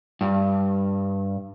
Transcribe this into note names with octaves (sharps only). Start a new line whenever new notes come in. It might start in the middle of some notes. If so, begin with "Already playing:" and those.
G2